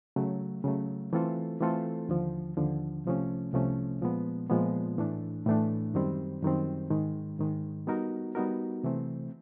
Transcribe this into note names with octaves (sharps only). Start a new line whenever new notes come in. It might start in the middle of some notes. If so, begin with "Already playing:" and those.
C#3 F#3 A3
C#3 F#3 A3
E3 A3 C4 F4 A4
E3 A3 C4 F4 A4
D#2 D3 F3
D#2 D3 F3
C2 C3 F3 A3 C#4
C2 C3 F3 A3 C#4
A#2 F3 G#3 B3
A#2 F3 G#3 B3
A2 E3 A3 D4
A2 E3 A3 D4
F#2 D#3 G3 C4
F#2 D#3 G3 C4
G#2 D#3 G#3
G#2 D#3 G#3
G3 B3 D#4 F#4 A#4
G3 B3 D#4 F#4 A#4
C3 E3 A3 C4